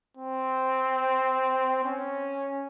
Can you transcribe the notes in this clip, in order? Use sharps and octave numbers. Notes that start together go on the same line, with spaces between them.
C4
C#4